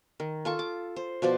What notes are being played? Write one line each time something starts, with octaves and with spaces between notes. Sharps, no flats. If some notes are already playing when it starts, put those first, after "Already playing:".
D#3
F4 A4 C#6
D6
C5
B2 F3 C5 D5